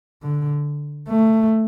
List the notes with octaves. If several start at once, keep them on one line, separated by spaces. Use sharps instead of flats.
D3
A3